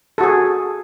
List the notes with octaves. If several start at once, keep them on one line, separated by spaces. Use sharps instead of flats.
F#4 G#4 A4